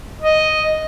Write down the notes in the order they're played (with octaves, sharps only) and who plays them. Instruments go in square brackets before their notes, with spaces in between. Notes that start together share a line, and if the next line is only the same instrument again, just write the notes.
[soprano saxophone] D#5